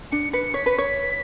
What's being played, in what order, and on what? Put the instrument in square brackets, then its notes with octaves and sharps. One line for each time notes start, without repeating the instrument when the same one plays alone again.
[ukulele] D4 [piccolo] C#7
[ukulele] B4 [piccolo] C#7
[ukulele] C#5 [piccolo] B6
[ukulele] B4
C#5